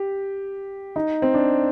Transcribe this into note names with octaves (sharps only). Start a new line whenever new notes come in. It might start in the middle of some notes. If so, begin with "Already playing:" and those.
Already playing: G4
D#4
C4
D4